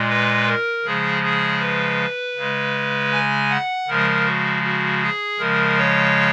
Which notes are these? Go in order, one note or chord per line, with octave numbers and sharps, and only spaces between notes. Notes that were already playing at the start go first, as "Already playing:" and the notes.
Already playing: A#2 G#3
B4
A#4
C#3 F3 G#3 G#4
G#4
B4
C#3 G#3
G#5
F#5
C#3 F3 G#3 A#4
F#4
F#4
G#4
C#3 F3 G#3 A#4
C#5